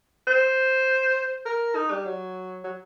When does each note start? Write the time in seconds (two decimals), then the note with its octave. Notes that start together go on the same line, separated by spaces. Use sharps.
0.27 C5
1.45 A#4
1.75 D#4
1.91 G3
2.05 F#3
2.64 F#3